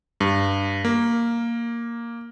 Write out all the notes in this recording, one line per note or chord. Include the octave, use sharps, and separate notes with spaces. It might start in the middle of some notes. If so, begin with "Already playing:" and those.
G2
A#3